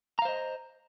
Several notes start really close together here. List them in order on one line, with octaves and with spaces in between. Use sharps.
A#5 F5 C5 D#5